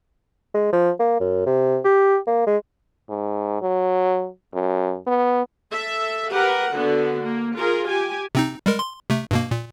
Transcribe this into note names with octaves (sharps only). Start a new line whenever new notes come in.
G#3
F3
A#3
F#2
C3
G4
A#3
G#3
G#2
F#3
F#2
B3
A4 E5
G4 A#4 B4 F#5
D3 B3 F#4
A#3
F4 G#4 A#4
G4 G#5
C3 C4 D#4
G3 G#3 A#4
C6
C3 A3
G2 B2 A#3
A#2